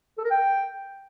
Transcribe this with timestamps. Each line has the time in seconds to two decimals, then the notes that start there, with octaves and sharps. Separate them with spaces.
0.18 A4
0.24 A#4
0.31 G5